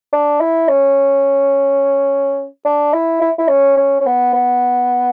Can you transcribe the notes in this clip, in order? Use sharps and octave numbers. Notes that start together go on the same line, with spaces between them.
D4
E4
C#4
D4
E4
E4
E4
C#4
C#4
C#4
B3
B3